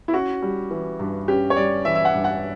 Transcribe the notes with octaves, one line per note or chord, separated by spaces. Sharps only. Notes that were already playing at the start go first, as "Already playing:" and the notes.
E4
C#4 F#4
G3
E3
G2
C#4 G4
C#5
G3 D5
E3 E5
E5
F#5
G2
F#5